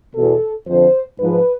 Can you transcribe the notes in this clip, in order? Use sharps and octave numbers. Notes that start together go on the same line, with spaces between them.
E2 B2 A4
F2 D3 F3 C5
G#2 F3 B4